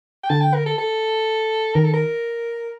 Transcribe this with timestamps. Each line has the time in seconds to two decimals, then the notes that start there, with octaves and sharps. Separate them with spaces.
0.24 G5
0.30 D3 A5
0.41 G5
0.54 A#4
0.66 A4
0.78 A4
1.74 D#3 A#4
1.84 A4
1.94 A#4